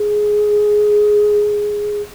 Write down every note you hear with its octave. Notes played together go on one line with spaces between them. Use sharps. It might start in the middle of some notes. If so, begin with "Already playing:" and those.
Already playing: G#4